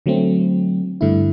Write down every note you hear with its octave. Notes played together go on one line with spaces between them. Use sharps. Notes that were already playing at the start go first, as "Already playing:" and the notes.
D3 F#3 A3 C4
G2 D3 A3 E4